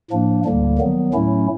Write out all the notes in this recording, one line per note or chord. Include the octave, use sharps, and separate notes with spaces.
A2 F3 A#3 D4
D2 D3 G3 A#3
D#3 F#3 B3
A2 F#3 A3 C#4 E4